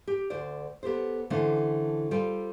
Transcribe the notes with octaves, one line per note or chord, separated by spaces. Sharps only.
G4
D2 C5 D5
B3 G4 A4 C5
D3 E3 A3 C#4 D4 C5
G3 F4 A4 C5 G5